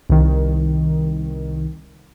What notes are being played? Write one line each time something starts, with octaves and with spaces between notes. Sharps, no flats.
C2 D#3